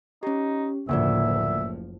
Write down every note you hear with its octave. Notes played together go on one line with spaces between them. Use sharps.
C#4 D#4 G4
F#1 D2 A2 F3 A#3 A#4 D5 E5